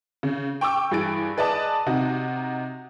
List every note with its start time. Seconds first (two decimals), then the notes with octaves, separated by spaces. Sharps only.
0.23 C#3
0.61 G5 C#6 D6 E6
0.91 G2 E3 G#4 A6 D7
1.37 G#4 B4 D5 D#5 A5 D#6
1.86 C3 D#4 F#4